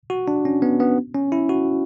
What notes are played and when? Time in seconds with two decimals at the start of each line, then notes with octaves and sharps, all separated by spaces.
0.10 F#4
0.28 D4
0.45 C#4
0.62 B3
0.80 B3
1.14 C#4
1.32 E4
1.49 F#4